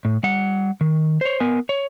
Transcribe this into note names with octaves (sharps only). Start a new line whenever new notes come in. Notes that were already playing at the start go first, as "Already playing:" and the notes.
A2
G3 F#5
D#3
C5 C#5
B3 A#4 G#5
C#5